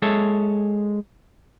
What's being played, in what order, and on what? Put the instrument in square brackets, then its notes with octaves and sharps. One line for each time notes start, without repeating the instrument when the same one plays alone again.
[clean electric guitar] G#3 A4 C#5 E5